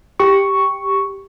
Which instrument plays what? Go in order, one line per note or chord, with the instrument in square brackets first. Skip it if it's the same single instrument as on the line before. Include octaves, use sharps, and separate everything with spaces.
[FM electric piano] G4 C#6